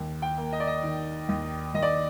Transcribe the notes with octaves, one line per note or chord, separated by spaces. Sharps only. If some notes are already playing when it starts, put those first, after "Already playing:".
Already playing: D#2
G5
A#3
D#5
D5
D#5
D#3
D#2
D#2 D#5
D5